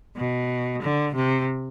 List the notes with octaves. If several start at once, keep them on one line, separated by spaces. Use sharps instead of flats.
B2
D3
C3